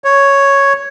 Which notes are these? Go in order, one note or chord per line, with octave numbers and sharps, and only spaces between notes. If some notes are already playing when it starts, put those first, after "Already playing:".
C#5